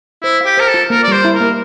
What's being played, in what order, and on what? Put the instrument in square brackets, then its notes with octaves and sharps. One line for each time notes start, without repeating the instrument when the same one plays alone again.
[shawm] E4 [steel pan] C5
[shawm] G4 [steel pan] F5
[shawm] A#4 [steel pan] C5
[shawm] A4
[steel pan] F4
[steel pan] A#3 [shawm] A#4
[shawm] D5
[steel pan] G3 [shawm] C5
[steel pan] E4
[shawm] A#4
[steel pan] A#3